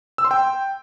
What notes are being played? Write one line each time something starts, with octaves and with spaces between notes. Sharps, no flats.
E6
C6
G5